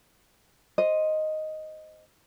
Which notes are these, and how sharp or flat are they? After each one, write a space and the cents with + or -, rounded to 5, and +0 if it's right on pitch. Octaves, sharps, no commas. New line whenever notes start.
C5 +0 D#5 +0